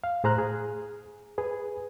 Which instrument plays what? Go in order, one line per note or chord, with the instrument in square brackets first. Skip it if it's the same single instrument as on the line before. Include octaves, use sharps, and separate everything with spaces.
[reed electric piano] F5
A2 G#4 C5 A#5 F6 F#6
G#4
G#4 B4